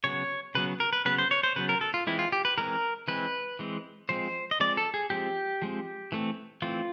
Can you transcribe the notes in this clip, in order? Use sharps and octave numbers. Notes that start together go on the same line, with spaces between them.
C#3 F#3 B3 C#5
C#3 F#3 B3 B4
A#4
B4
C#3 F#3 B3 B4
C5
C#5
C5
C#3 F#3 B3 B4
A#4
A4
F4
E3 G#3 C4 E4
F4
G4
B4
E3 G#3 C4 A#4
E3 G#3 C4 B4
E3 G#3 C4
F3 G#3 C4 C5
D#5
F3 G#3 C4 D5
A4
G#4
F3 G#3 C4 G4
F3 G#3 C4
E3 A3 C4
E3 A3 C4 F4